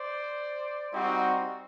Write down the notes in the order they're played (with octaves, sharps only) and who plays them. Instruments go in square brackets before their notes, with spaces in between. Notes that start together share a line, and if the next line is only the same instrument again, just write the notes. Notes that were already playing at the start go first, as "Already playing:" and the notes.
Already playing: [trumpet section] C5 D5
G3 C4 D#4 F#4